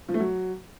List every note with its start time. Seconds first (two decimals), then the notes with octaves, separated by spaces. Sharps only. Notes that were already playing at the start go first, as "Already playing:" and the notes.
0.08 F3
0.14 A3
0.20 F#3